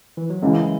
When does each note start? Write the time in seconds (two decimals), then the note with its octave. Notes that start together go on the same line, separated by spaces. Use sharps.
0.17 E3
0.30 F#3
0.42 F#2 C#3 E3 G#3